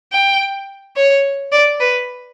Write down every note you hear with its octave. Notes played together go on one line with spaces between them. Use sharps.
G5
C#5
D5
B4